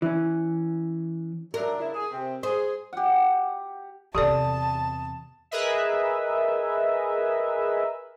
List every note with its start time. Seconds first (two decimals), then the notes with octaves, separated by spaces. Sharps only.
0.02 E3 C#4
1.54 F#3 A3 D4 A#4
1.78 C#3 D4 E4
1.95 G#4
2.11 C3 C4
2.43 G#4 C5
2.93 G4 F#5
4.15 E2 C3 G4 A4 D5 A5 D#6
5.51 G#4 A#4 B4 D#5 E5